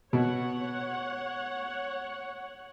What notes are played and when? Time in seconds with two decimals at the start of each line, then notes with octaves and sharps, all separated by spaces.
0.13 B2 C#5 F#5